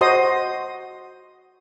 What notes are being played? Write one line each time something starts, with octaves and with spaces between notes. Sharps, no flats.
F#4 C5 D#5 C6 D#6